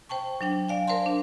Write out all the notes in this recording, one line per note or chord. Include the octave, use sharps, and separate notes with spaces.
C5 G5 A5 C#6
F#3 D4 G5
D5 F5 G#5
A#4 C5 F5 A5 C6
D4